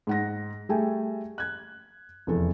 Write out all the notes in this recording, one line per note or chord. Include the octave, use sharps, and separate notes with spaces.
G#2 F#5 A#6
G3 A3 G#4 A4 G5 G#5
F#6 G#6
F1 E2 A4